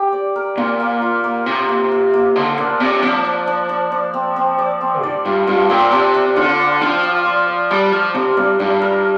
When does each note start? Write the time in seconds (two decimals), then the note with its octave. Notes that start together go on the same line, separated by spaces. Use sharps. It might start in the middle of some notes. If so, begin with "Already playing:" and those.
Already playing: C4 G4
0.13 D5
0.36 A#4
0.57 A#2 A#3
0.80 A#3
1.02 F4
1.24 A#3
1.46 C3 C5
1.69 A#3
1.92 A#3
2.14 A#3
2.36 D3 C5
2.58 A#2 D4
2.80 C3 D4
3.02 F3 D4
3.25 D4
3.47 D4
3.69 D4
3.92 D4
4.14 C4
4.36 C4
4.59 D5
4.81 C4
5.03 G2 D5
5.25 G2 F4
5.47 G2 F4
5.70 A#2 C4
5.91 C3 D4
6.14 D4
6.36 D3 F4
6.59 D5
6.81 F3 F5
7.03 F4
7.26 D5
7.48 D5
7.70 G3 D4
7.92 F3 F5
8.14 C3 A#4
8.37 G2 D4
8.59 G2 D4
8.82 A#4